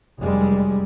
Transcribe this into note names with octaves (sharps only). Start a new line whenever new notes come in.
F1 F#2 G3 G#3